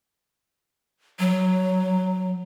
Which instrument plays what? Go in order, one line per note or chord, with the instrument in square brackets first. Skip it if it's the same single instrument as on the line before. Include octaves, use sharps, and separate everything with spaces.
[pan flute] F#3